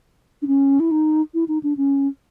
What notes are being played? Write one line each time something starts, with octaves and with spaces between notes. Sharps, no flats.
D4
C#4
E4
D#4
E4
D#4
D4
C#4